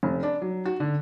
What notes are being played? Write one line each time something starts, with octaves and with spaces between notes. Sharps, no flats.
F1
D4
F#3
F#4
D3